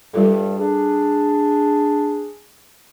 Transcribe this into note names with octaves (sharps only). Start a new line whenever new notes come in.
G2 G3 F4 A4
D4 G#4